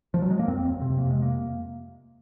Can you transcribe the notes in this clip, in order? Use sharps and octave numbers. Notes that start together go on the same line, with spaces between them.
F3
F#3
G#3
A#3
F2 C4
F2
C3
F2 A#3
C3 G#3
A#3